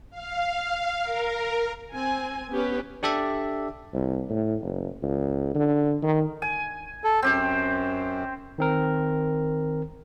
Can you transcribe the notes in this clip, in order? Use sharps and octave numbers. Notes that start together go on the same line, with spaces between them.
F5
A#4
C4 G#5
B3 C#4 G4 B4
D4 G4 A4 D5 E5
C2
A2
F#1
C#2
D3
D#3
G#5
A4
F#2 C4 G4 C5
D#3 C4 A#4